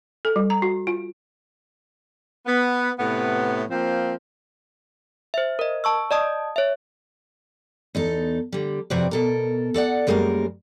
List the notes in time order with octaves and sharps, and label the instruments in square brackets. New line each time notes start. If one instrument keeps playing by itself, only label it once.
[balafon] A4
G3
A#5
F#4
F4
[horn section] B3
A2 C3 B3
F3 A#3 C4
[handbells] C5 E5
A#4 D#5
A5 C#6 E6
D5 D#5 A5 D#6
C#5 E5
[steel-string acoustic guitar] E2 D#4 A4
D3 G3
F2 C3 C4 F#4 B4 D5
B2 A4 A#4
A4 D5 E5 F#5
F#2 G3 G#3 A#3 G4 A#4